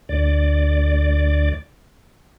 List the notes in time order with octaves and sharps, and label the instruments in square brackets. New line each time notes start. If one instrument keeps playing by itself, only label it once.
[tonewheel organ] D2 D5